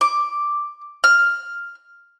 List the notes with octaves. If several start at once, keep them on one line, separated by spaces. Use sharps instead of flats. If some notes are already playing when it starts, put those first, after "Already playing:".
D6
F6